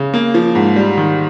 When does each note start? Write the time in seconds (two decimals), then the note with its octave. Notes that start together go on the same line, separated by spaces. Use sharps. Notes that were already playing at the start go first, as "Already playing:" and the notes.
Already playing: C#3
0.14 A#3
0.34 F3
0.55 G#2
0.76 G3
0.97 D#3